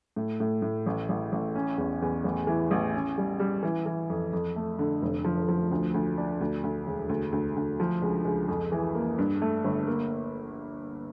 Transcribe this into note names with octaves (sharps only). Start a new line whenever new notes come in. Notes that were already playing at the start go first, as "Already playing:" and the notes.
A2
A2
A2
A1
A1
A1
C#4
E2
E2
A1
E3
A1
C#4
G3
G3
E3
E3
F2
F2
A3
D3
F1
F3
F3
D2
D2
D4
D2
D2
E1
D2
D2
D2
F3
C#2
C#2
F2
E3
A#3
G2
A3
G1
A#3